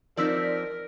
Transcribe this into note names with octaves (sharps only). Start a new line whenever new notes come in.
F3 C4 D#4 A#4 D5 E6 B6